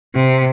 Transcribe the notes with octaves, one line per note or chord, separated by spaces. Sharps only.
C3